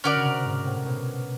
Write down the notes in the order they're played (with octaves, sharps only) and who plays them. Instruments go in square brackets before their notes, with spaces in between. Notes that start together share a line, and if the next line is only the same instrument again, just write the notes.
[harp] D3 [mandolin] C#4 F#4 A#4 D5
[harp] C#3
C3
G#2
A2
B2